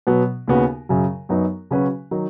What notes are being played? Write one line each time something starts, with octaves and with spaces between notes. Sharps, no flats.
B2 F#3 B3
D#2 C#3 B3 F#4
F#2 C#3 F#3
F#2 F#3 B3 D#4
C#3 F#3 C#4 F#4 B4
D#3 F#3 D#4